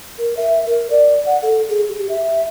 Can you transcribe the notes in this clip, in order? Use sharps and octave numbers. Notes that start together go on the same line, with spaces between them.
A#4
E5
A#4
D5
F#5
A4
G#4
G4
E5